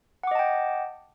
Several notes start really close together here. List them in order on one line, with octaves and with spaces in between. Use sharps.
F#5 D6 D#5 A5 G5